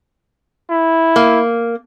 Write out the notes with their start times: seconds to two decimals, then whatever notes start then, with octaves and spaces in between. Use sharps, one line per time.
0.70 E4
1.16 A#3